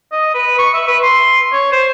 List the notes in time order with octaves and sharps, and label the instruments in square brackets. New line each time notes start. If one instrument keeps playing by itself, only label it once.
[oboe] D#5
B4
C#6
E5
B4
C6
C#5
C5